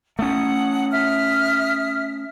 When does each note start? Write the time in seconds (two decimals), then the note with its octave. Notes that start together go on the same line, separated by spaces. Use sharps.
0.19 A3 C#4 F#5 D#6
0.92 E5 D#6 F6